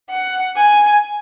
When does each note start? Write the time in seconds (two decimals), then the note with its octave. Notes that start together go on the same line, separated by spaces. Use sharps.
0.10 F#5
0.57 G#5